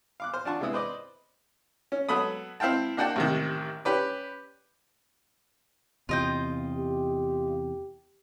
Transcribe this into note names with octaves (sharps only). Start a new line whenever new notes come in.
F5 D6 F#6
C5 F6
D4 F4 F#5 A5 C#6
C3 G#3 B3 E4 D#6
B4 C5 D5 D#5
C#4
F#3 B3 A4 B5 D#6
C4 E4 F5 G5 A5
A#3 D4 F#4 F#5 G5 A5
A1 C3 D#3
C#4 G4 B4 D5
E2 C3 F4 D#5 G5
G4